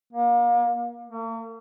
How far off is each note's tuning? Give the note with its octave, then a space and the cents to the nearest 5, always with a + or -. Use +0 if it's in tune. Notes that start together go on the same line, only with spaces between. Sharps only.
A#3 +35
A#3 -45